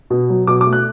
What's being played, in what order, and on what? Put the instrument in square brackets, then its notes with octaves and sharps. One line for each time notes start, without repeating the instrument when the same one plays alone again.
[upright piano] B2
F#3
B2 D6
D6
A3
F#6